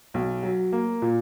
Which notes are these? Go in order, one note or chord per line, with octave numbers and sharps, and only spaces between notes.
B1
F#3
A#3
A#2